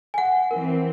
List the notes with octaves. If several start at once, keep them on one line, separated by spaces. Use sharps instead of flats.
F#5 G#5
E3 C4 A#4